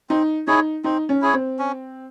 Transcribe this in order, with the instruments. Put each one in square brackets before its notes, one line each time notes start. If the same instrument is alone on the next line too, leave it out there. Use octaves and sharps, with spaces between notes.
[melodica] C4 [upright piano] D#4
[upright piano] D#4 [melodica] E4 G#4 C#5
[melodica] C4 [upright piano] D#4
[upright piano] C#4
[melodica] E4 G#4 C#5
[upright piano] C4
[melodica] C#4